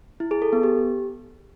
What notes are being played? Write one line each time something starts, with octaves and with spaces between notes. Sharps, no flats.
E4
G#4
A4
B3
G4